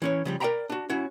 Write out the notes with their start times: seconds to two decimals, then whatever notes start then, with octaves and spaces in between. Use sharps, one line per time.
0.02 E3 C#4 C#5
0.25 C#3 F3 G3
0.40 A#4 D5 E5 G5 A#5 B5
0.70 D4 F#4
0.89 C#4 E4 F#4